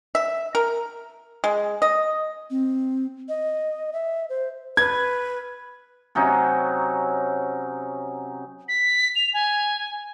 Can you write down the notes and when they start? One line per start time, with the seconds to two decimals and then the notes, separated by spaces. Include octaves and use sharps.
0.15 E5
0.55 A#4
1.44 G#3
1.82 D#5
2.50 C4
3.29 D#5
3.93 E5
4.30 C5
4.77 B4 G#6
6.15 C3 F#3 C#4 D#4
8.68 B6
9.16 F7
9.34 G#5